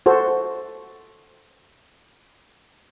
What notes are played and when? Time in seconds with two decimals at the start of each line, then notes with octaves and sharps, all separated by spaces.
0.06 F#4 A4 C5